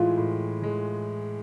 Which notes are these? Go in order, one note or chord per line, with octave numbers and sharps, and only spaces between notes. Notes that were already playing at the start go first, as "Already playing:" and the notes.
Already playing: A2 E3 G#3 F4
A2
E3 G#3